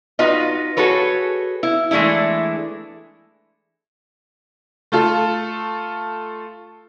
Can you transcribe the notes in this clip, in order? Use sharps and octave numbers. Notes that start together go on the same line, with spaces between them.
D#4 F4 F#4 B4 D#5
F#4 G#4 A4 B4 C#5
E4
E3 G#3 A3 D4 E4
A3 F4 A4